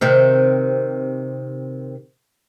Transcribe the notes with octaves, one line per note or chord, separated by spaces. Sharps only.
C3 D#3 C4